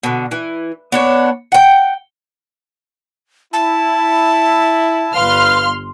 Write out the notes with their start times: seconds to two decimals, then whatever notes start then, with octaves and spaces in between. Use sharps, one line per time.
0.03 B2 D3
0.31 E3
0.92 B3 D4 C#5
1.52 F#5 G5
3.53 E4 A5
5.15 G1 B4 F5 C6 F6